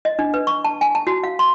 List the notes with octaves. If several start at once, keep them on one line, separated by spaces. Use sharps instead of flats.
D#5
D4
B4
C#6
A5
G#5
A5
F#4
F5
C6